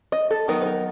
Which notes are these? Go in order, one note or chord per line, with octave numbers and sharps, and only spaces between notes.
D#5
A4
D#3 F#3 B3 D#4 A#4
B4
A#4